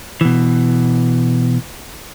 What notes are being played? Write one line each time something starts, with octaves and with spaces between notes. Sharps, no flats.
B2 E3